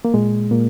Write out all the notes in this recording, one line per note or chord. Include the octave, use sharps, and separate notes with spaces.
A#3
A#2 G#3
A#2 A#3